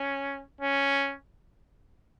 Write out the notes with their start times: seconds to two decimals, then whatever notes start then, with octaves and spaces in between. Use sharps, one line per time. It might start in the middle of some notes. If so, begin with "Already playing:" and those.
Already playing: C#4
0.61 C#4